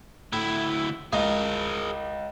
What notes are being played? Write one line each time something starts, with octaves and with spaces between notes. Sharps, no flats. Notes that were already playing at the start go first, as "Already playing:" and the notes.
D2 A2 E4
C#2 G#4 A#4